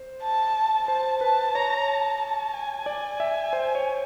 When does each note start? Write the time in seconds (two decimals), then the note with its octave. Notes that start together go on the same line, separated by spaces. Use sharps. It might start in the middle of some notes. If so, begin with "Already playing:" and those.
Already playing: C5
0.23 A5
0.88 C5 A5
1.21 B4 A5
1.55 C#5 A#5
1.88 A5
2.20 A5
2.53 G#5
2.86 D5
3.20 E5
3.53 C5
3.75 C#5